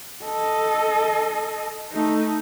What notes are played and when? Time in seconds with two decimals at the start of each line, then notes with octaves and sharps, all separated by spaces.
0.24 A4 D#5
1.92 A3 D#4